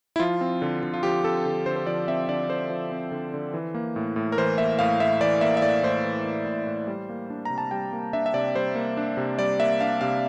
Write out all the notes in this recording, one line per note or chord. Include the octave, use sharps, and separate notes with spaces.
E4
F3 F4
C4
D3
D3
F4
F3 G4
C4 A4
D3
D3 C5
C5
F3 D5
C4 E5
D3 D5
D3 C5
F3
C4
D3
D3
E3
A#3
A2
A2
A#4
E3 C5
A#3 E5
A2 F5
A2 E5
E3 D5
A#3 E5
E5
A2 D5
A2 C5
E3
A#3
A2
A2
G3
A#3
D4
C3 A#5
A5
G3 G5
A#3
D4 E5
E5
C3 D5
G3 C5
A#3
D4
C3
G3 D5
A#3 E5
D4 F5
C3 F5